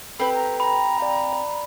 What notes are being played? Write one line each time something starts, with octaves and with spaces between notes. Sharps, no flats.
C4 G4 A4 B4 B5
A#5
A#5 B5
D5 F5 G5
D5